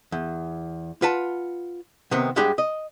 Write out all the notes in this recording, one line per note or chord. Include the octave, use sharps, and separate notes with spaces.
E2
F4 B4 F#5 A5
C3 D#3 B3 C4
G2 G3 G#3 D4 G4 F#5
D#5